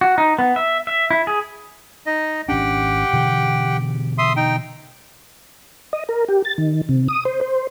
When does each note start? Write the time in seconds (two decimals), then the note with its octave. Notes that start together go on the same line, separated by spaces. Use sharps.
0.01 F#4
0.18 D#4
0.39 B3
0.56 E5
0.87 E5
1.11 E4
1.27 G#4
2.06 D#4 D#5
2.49 G#1 C#4 D4 G4 F#5 G5
3.13 B2 D3 E3
4.18 E5 C6 D#6
4.36 D#4 G5
5.93 D#5
6.09 A#4
6.28 G4
6.45 A6
6.58 D#3
6.89 C3
7.08 D#6
7.25 C5
7.41 C5